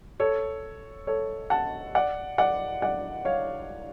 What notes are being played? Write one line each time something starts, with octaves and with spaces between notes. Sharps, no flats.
A4 C#5
A4 C#5
F#5 A5
D5 F#5
D5 F#5
D5 F#5
C#5 F5